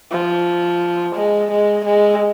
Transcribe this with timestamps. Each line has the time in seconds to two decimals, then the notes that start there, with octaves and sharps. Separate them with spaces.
0.12 F3
1.16 G#3
1.51 G#3
1.85 G#3